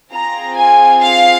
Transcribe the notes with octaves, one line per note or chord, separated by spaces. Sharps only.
C4 F4 G#4 A#5
G#5
F5